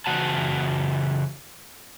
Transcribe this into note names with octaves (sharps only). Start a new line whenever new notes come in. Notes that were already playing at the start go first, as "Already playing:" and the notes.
C#3 E3 F#4 F#5 A5